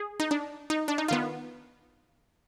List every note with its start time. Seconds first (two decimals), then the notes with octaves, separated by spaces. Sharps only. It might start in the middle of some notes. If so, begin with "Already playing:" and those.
Already playing: G#4
0.20 D#4
0.31 D4
0.70 D#4
0.88 D4
0.98 D#4
1.08 D#3 B3 F4